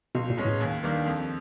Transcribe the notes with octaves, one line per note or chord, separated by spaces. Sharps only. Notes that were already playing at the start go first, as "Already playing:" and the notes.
C#2 B2
A#2
B2 G#3 C#4
A2
D#2
D#3 G3 A#3 D4
F2